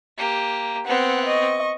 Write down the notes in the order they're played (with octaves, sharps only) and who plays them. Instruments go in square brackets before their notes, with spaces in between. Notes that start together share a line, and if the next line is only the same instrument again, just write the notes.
[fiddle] A#3 G4
[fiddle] B3 C4 [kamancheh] F#5
[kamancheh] D#5 C#6